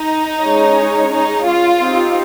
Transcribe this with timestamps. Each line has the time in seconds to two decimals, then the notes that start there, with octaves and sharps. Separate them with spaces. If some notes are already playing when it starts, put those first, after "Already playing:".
Already playing: D#4
0.45 G#3 C#4 G#4 C#5
1.13 D#4
1.46 F4
1.81 C4 D#4 G4